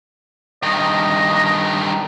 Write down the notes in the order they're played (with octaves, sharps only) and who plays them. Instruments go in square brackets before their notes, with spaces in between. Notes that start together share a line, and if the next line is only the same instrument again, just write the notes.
[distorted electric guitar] G2 D#3 [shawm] D#5